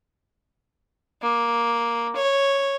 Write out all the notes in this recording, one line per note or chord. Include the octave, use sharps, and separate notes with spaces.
A#3
C#5